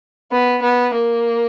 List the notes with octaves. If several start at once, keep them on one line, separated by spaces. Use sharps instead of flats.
B3
B3
A#3